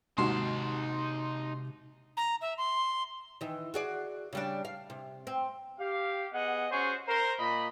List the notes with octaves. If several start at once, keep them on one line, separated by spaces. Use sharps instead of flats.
D#2 G#2 C3 D#4 F#4 A5 C6
A#5
E5
C6
D#3 E3
F#4 G#4 D5
C#3 G3 D4
F5
C3
C4
G4 F5
B3 G#4 D#5 F#5
C#4 F#4 G#4 C5 C#5
A#4 C5
A#2 D#5 B5